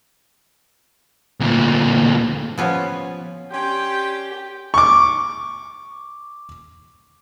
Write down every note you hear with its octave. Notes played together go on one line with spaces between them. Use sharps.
D2 A#2
F3 B3 C#4
C#4 D4 G4 G5 C6
C#6 D6